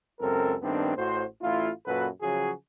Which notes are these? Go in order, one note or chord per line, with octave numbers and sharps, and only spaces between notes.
C#2 F#2 C4 A4 A#4
G2 D#3 A3 B3 C4 D4
A1 F#4 C5
A1 A3 E4 F4
F#2 A#2 F#4 A4 B4
C#3 F3 F#3 F#4 G#4